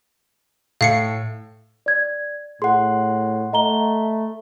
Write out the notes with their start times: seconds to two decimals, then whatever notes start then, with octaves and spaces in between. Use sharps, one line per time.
0.81 A2 F5 C7 C#7
1.86 D5 G#6
2.62 A2 G#4 F#5 C6
3.53 A3 D#5 A#5 G7